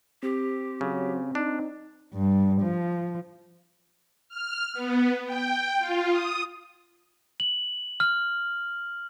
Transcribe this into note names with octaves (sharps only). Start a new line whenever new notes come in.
C4 G4
C#3 F#3
D4 D#4
G2
F3
F6
B3
G5
F4
D#6
F#7
F6